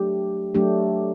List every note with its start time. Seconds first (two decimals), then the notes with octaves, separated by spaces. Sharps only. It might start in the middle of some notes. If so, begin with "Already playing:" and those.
Already playing: F#3 A3 D4 G4
0.55 F#3 A3 D4 G4